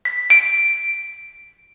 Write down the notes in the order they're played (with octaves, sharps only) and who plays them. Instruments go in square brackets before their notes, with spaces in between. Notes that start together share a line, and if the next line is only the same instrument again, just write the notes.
[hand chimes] B6
D7